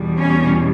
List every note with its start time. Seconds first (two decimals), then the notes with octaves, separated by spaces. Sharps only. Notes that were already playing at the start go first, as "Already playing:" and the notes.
Already playing: E2 B2 G3
0.17 C#4